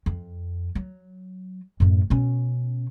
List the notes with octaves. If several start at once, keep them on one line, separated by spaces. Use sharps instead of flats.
F2
F#3
F#2 A2
B2 C#4